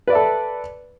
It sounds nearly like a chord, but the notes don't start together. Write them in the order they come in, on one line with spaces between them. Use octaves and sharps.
B4 D5 E5 A4